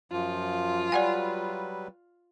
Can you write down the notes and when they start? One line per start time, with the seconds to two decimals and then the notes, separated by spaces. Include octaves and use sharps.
0.12 F#2 F3 F4
0.92 F#3 G3 B4 D5 F#5 G#5